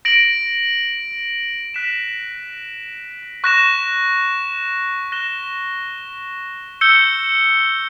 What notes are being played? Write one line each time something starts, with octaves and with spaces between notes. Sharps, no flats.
A#6 D7 F#7
F#6 B6 E7
C#6 F#6 A#6 E7
F#6 A#6 E7 G7
E6 G6 C#7 G7